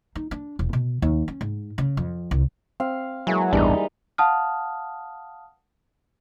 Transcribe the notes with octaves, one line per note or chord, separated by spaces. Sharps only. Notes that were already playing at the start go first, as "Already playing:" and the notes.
D#4
D4
E1
B2
D#2
C#4
G#2
C#3
F2
C2
C4 F5
E3 F#3 G#3 A#3
A1 E2 G2 G3 D4 D#4
F5 F#5 A5 D#6 F6